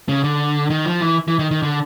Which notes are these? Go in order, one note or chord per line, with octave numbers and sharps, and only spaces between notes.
C#3
D3
D#3
F3
E3
E3
D#3
D#3
D3